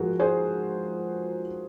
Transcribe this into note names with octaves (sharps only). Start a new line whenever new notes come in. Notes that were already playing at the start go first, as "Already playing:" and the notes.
Already playing: G#2 F3 F#4 G#4 A#4
G#4 C5